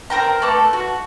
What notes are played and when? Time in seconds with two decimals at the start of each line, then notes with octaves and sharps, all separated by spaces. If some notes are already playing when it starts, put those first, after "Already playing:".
0.10 C4 A#4 G5 A#5
0.42 A3 A4 B4 D6
0.73 F#4